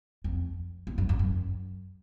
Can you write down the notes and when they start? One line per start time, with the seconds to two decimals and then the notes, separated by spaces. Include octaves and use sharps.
0.24 F2
0.87 E2
0.98 F#2
1.09 F2
1.19 F#2